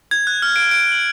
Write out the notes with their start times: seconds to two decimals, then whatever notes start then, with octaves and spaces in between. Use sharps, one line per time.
0.11 G#6
0.27 F#6
0.42 F6
0.56 D7
0.71 D7
0.92 F#7